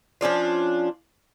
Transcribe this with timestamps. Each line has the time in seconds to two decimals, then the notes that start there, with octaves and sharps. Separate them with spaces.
0.21 F3 C#4 D4 F4